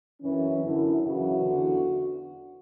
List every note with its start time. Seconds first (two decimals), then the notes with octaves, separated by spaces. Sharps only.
0.21 F#2 E3 C#4
0.61 F#2 D3 E4
1.03 F#2 C#3 E3 F#4
1.45 E2 D3